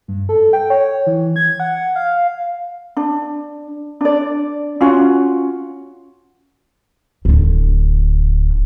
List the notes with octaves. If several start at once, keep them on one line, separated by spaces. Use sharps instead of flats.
G2
A4
G5
C#5
E3
G#6
F#5
F5
D4
D4 D5
C#4 F4 F#4
D1 D3